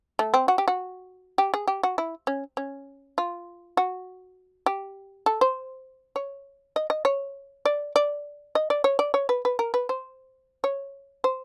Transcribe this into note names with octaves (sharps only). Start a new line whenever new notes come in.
A3
C4
F#4
G4
F#4
G4
G#4
G4
F#4
E4
C#4
C#4
F4
F#4
G4
A4
C5
C#5
D#5
D#5
C#5
D5
D5
D#5
D5
C#5
D5
C#5
B4
B4
A#4
B4
C5
C#5
C5